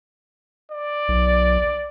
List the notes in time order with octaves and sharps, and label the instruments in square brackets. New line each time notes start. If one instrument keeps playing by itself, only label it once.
[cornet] D5
[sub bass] B1